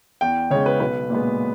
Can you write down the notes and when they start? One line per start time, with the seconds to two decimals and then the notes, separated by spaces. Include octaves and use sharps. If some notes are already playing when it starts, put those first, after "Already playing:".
0.21 E2 G5
0.50 C#3 G#3 C#5
0.66 B4
0.80 B1 B4
1.10 A#2 G#3 B3